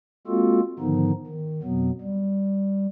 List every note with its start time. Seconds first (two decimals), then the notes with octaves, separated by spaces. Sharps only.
0.27 G#3 A#3 C4 F4 F#4 A4
0.79 G#2 D3 D#3 F3 B3 D#4
1.27 D#3
1.63 F2 B2 F#3 B3
2.01 G3